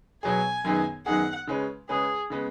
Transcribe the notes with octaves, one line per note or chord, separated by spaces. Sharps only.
B2 F#3 B3 G#4 G#5
F#2 D#3 B3 D#4 G#4
F#2 D#3 B3 D#4 G#4 F#5
C#3 G#3 C#4 B4
C#3 G#3 C#4 G#4 B4
C#3 G#3 B3